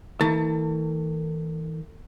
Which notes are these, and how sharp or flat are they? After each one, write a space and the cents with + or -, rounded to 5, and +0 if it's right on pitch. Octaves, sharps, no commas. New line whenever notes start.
E3 -45 A3 +40 A5 +30